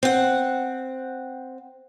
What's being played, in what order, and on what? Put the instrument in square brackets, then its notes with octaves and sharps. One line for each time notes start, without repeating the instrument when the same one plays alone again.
[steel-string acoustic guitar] C4 F#5